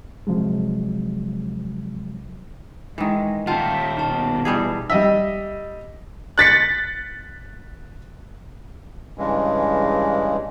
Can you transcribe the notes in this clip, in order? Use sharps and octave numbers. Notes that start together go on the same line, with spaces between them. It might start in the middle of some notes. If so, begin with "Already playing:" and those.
C3 F3 F#3 G#3
D#3 E3 G#3
A#2 D#3 F4 E5 F#5 G5 A5
B2 D#4 A5
E3 G3 G#4
G3 D#5 E5
F#6 A6 B6 C#7
G2 C#3 E3 G#3